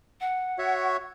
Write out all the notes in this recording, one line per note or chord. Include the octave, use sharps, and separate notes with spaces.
F#5
F#4 C#5 E5